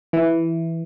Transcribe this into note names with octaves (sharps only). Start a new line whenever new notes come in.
E3